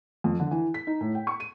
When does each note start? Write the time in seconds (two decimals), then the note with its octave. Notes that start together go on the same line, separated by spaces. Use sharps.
0.24 F2
0.40 D3
0.51 E3
0.74 B6
0.87 D#4
1.01 A2
1.15 G5
1.27 C#6
1.40 D#7